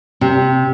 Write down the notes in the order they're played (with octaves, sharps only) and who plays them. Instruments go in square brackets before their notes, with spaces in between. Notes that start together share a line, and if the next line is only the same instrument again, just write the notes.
[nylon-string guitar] C3